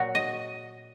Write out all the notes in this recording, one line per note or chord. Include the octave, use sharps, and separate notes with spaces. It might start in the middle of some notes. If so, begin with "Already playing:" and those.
Already playing: A#2 F#3 F#4
D#5